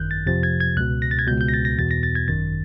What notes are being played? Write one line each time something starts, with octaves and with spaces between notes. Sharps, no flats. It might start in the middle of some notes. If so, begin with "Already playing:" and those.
Already playing: G#1 F#2 D#3 F#6 G6
A6
F2 C3 F3 A6
G#6
G#6
C#2 B2 F#6
A#6
A6
G#6
C#2 B2 G6
G6
A#6
A6
A#6
E2 B2 A6
A#6
A6
G#6
G#1 F#2 D#3 A6